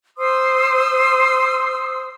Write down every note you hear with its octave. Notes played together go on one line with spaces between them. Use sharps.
C5 C6 D#6 E6